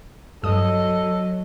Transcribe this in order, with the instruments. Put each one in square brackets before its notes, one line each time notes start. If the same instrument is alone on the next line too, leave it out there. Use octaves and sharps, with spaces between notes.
[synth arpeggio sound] G2 D#6 [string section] F#3 [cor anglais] A4 [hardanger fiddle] D#5